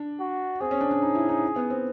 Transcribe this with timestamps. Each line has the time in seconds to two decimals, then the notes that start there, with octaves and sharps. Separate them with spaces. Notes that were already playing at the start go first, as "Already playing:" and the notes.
Already playing: D4
0.20 F#4
0.61 C4 G#4
0.71 C#4
0.81 D4
0.91 D4
1.02 D#4
1.15 E4
1.29 D#4
1.56 B3
1.70 C4